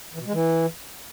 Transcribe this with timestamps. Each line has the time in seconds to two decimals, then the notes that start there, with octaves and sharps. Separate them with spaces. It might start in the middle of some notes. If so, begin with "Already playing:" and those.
0.14 E3
0.20 B2
0.26 G#3
0.33 E3